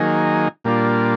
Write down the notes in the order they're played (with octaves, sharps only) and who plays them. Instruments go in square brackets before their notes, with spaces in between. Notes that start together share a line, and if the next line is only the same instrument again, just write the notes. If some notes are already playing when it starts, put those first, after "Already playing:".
Already playing: [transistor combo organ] D#3 F#3 A#3 D#4 G#4
A#2 G3 A#3 D4 F4